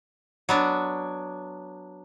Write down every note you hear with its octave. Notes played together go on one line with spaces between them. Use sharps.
F#3 B3 D4